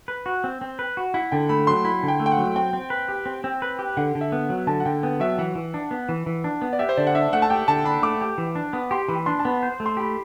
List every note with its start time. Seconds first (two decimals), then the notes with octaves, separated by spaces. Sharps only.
0.08 B4
0.26 F#4
0.44 C4
0.61 C4
0.79 B4
0.97 F#4
1.14 E4 F#5
1.32 D3 G5
1.49 A3 B5
1.67 F#3 C6
1.85 E4 B5
2.03 D3
2.08 G5
2.20 A3
2.26 G5
2.32 F#5
2.38 F#3
2.56 C4 G5
2.73 C4
2.90 B4
3.08 G4
3.26 C4
3.44 C4
3.62 B4
3.79 G4
3.97 D3 F#5
4.15 D3
4.21 E5
4.32 B3
4.49 F#3
4.67 D3 A5
4.80 F#5
4.86 D3 G5
5.03 B3 G5
5.20 F#3 E5
5.38 E3 F#5
5.55 E3
5.74 D4
5.91 B3
6.09 E3
6.26 E3
6.44 D4
6.62 B3
6.73 D5
6.79 G4 E5
6.89 C5
6.97 D3 D5
7.07 F#5
7.15 D4 E5
7.33 A3 F#5
7.42 A5
7.50 G4 G5
7.68 D3 A5
7.85 D4 B5
8.03 A3 D6
8.21 G4
8.38 E3
8.56 D4
8.73 B3
8.91 G4 C6
9.09 E3 B5
9.26 D4 C6
9.39 A5
9.45 B3 B5
9.63 C5
9.80 A3
9.86 C6
9.97 G4 B5